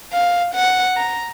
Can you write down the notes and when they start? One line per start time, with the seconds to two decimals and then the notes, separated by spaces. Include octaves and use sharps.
0.13 F5
0.55 F#5
0.97 A#5